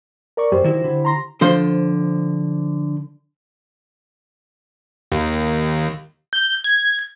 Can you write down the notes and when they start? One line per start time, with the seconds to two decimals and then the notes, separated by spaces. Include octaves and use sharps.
0.37 A#4 D5 C#6
0.52 F#2 G4 C5
0.64 D#3 E4 F#4
0.84 D3 E4
1.05 A#5 C6 A#6
1.41 D3 F3 C5 C6
5.12 D#2
6.33 G6
6.64 G#6